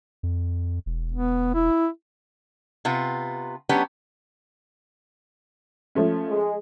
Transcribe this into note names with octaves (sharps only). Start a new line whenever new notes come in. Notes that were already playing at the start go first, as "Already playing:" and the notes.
F2
E1
B3
E4
C3 B3 F4
F#3 B3 C#4 D4 G4
F3 A3 C#4
G#3